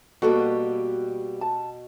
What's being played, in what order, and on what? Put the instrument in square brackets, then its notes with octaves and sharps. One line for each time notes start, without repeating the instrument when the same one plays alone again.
[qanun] B2 [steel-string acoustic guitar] G3 A#3 G4 [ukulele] F#4 A4
[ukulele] A5